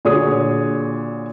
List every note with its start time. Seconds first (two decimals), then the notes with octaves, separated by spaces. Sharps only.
0.05 A#2 D3 F#4 G#4 C#5 D#6